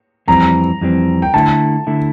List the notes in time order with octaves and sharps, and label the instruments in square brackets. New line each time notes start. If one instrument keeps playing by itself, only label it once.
[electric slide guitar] F2 E3 G3 C4 [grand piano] A#5
[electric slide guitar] F2 E3 G3 C4
[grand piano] G5
[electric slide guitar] D3 A3 E4 [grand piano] A5
[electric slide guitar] D3 A3 E4